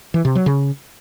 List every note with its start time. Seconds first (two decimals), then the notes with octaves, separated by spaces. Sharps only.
0.14 E3
0.25 C3
0.35 F#3
0.46 C#3